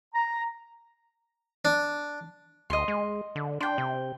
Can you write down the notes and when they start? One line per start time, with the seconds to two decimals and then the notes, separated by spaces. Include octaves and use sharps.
0.15 A#5
1.65 D4
2.70 D2 D#5 C6
2.88 G#3
3.36 D3
3.61 D4 G5 C6
3.78 C3